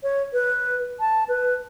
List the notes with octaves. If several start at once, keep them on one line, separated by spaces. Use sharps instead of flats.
C#5
B4
A5
B4